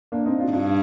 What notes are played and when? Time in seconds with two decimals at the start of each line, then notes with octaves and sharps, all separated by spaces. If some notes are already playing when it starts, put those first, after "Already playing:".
0.12 A#3 D4
0.26 C4 D#4
0.39 D4 F4
0.52 G2 D4 F4